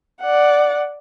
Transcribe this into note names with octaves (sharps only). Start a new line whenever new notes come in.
D5 F#5